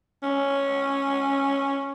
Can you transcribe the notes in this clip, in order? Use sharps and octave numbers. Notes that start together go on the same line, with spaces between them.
C#4